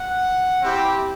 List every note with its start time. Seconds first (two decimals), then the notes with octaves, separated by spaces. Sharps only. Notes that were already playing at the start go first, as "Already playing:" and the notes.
Already playing: F#5
0.62 C4 E4 G4